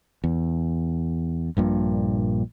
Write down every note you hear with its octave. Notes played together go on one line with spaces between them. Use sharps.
E2
A#1 G2 A#2